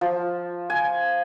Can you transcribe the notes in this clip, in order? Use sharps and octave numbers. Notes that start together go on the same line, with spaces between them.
F3
G#5